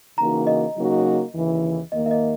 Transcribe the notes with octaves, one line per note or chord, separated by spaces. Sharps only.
C#3 E3 A#3 D#4 F#4 A#5
D#5
C#3 F#3 A#3 D#4 F#4
D#2 C#3 E3
D#2 D#3 A#3 D#5
E5
D#5